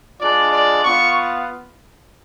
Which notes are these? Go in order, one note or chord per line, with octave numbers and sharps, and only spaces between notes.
G#3 D4 F4 D5
D5
B3 F4 C#6